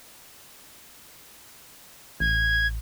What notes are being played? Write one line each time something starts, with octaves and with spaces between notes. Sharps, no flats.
A1 G#6